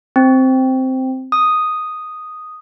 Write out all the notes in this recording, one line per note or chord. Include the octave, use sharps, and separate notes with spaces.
C4
D#6